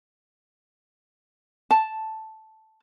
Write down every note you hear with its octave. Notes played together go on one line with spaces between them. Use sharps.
A5